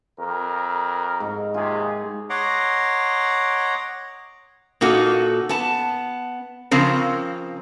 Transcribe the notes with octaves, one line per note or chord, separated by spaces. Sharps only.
F2 A#4
G#2
D#2 C3 F4 G#4
C#5 D#5 F#5 A#5 C6 D6
A#2 A#3 D#4 F#4 A4
B3 A5
C#3 F3 C4 A#4